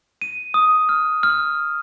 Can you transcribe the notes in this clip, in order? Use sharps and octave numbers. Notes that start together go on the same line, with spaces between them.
D#7
D#6
F6
F6